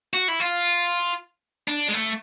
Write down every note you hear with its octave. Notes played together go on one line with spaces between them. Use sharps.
F#4
E4
F4
D4
G#3
A3